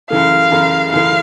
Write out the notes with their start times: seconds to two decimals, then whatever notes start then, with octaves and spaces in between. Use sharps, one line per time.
0.10 F#2 C#3 E3 A3 F5
0.51 F#2 C#3 E3 A3
0.92 F#2 C#3 E3 A3 F5